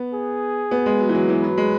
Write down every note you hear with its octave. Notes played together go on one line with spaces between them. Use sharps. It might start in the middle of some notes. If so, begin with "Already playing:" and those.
Already playing: B3
G#4
B3
G#3
F#3
E3
F#3
E3
F#3 B4
G#3